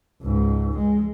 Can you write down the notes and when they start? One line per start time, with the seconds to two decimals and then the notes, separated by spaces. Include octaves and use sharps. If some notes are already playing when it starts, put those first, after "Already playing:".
0.23 C#2 G#2
0.77 G#3